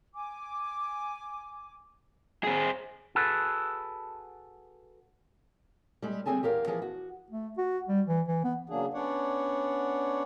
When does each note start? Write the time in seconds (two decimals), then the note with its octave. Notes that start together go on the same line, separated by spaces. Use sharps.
0.14 G#5 D6
2.44 C4 G#4
3.15 F#4 G#4 A4 B4
6.02 G3 G#3
6.26 D3 G3 C4 G#4 G#5 A5
6.43 E2 G4 A#4 F5
6.67 E3 F3 G#4
6.82 F#4
7.30 A3
7.58 F#4
7.89 G3
8.07 E3
8.28 E3
8.44 B3
8.69 C#3 F#3 A#3 D4 G#4
8.94 B3 C#4 D4 C#5 D5 F#5